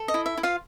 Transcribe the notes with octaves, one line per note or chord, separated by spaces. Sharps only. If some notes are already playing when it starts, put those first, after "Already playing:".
Already playing: A4
D#5
E4
E5
E4
F4 F5